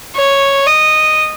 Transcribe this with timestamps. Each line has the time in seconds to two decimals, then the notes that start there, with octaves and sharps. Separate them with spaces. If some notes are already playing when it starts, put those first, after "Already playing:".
0.16 C#5
0.66 D#5